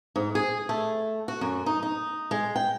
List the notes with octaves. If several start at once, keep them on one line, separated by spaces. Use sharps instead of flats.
G#2
G#4
A3
F#4
F#2
D#4
D#4
G#3
G5